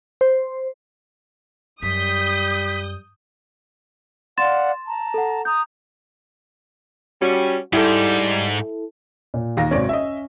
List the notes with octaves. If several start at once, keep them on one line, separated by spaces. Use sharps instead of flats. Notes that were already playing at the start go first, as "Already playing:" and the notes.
C5
F#2 G3 D#6 G6 B6
D5 F5 F#5 C6 A6 E7
A5 A#5
A4 F#5
A#5 D#6 G6
G3 C#4 F#4
G#2 G3 E4 A4
A#2
D#2 F5 A#6
G#1 F#2 C3 C#4 D5
C#4 D#5 E5